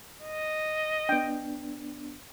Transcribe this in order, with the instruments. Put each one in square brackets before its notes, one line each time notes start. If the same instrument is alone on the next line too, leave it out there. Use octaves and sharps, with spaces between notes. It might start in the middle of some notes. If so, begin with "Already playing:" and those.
[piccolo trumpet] D#5
[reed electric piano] B3 D4 [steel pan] G5